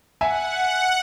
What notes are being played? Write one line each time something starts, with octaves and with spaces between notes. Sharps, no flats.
E5 F#5 G#5